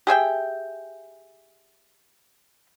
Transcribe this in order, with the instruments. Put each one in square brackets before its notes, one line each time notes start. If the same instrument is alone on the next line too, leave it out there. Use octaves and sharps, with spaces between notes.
[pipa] G4 G#4 E5 G5